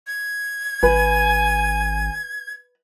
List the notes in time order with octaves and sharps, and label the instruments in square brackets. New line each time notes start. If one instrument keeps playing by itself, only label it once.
[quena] G#6
[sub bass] G#1 [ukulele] B4 [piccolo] G#5